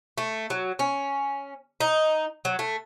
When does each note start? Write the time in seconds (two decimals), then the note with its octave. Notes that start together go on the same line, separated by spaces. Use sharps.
0.18 A3
0.50 F#3
0.79 C#4
1.81 D#4
2.45 F#3
2.59 A3